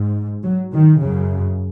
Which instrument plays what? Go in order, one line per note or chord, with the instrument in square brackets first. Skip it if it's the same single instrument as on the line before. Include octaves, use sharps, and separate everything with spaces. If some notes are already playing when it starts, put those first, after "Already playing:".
Already playing: [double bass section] G#2
F#3
D#3
F#2 C#3